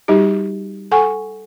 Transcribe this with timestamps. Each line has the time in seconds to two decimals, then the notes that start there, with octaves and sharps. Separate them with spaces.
0.08 G3 D#4 F#4 G4
0.91 A4 F#5 G#5 C#6